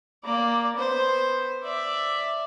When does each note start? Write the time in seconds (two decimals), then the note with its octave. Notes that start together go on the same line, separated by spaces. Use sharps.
0.24 A#3 D5
0.77 B3 C5
1.63 D5 E5